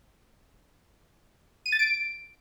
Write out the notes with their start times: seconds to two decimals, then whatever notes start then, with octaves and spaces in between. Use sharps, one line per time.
1.66 D#7
1.72 A6
1.79 D7